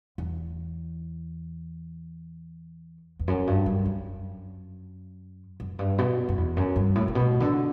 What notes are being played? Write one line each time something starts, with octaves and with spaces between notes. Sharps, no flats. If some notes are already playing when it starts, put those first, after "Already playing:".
E2
E2
F#2
G2
G2
F#2
F#2
G2
B2
F#2
E2
F#2
G2
A2
A2
B2
D3